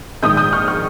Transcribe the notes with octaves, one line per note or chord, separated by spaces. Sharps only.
A#1 G#2 D#3 D#6 G6
D#6 G6
C#6 F6
C#6 F6